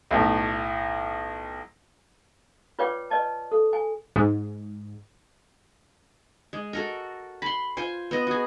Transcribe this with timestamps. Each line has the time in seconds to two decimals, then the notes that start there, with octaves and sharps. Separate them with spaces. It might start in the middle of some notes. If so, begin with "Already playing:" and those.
0.11 B1 A2
2.79 F4 B4 C#5 D5 G5 D6
3.10 B4 D5 D#5 A5
3.52 A4
3.73 G#5
4.16 G#2
6.53 G#3
6.73 F#4 A4 A#4
7.42 B5 C6
7.77 F4 C5 G#5
8.11 B3 D#5
8.27 F#4 G#4